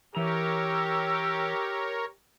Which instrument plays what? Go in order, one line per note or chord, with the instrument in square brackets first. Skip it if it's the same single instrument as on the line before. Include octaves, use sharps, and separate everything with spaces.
[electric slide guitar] E3 A#5 [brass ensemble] G4 [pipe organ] A#4 C#5 [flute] E6